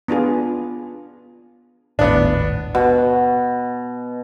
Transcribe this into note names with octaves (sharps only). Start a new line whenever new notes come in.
B3 D4 F4 G#4
D#1 G#1 A2 B3 D4
B2